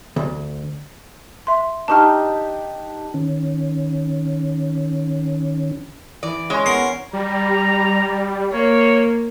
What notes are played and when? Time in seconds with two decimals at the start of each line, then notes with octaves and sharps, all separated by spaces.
0.16 D2
1.47 E5 C6
1.88 D4 D#4 G4 A5 C#6 F6
3.14 D#3 C#4
6.23 E3 D5
6.50 G#3 C#4
6.66 B3 A#4 C6
7.13 G3 A#5
8.52 A#3 C#5